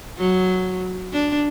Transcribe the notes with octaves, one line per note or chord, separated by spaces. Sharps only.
F#3
D4